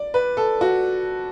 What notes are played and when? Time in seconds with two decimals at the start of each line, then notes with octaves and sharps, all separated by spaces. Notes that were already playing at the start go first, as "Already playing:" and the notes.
Already playing: D5
0.14 B4
0.37 A4
0.61 F#4